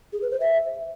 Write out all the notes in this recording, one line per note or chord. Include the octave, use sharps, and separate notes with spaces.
G#4
B4
C5
E5